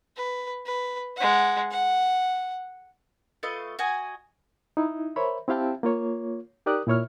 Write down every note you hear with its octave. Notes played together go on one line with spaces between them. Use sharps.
B4
B4
G#3 F#5
F#5
A3 F4 B4 D#5
F#4 D#5 G#5
D#4 E4
A#4 C5 C#5 E5 B5
C4 E4 G4 F5 G5 A5
A#3 F4 C#5
D#4 G4 A#4 D5 D#6 F#6
A#2 E4 C#5 F6